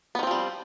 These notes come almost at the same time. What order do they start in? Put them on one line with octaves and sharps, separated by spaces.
B3 D#3 C4 F3 G3